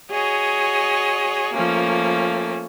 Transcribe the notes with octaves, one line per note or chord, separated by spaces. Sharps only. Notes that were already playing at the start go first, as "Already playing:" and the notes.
F#4 G#4 C#5 D#5
F3 A3 A#3 C#4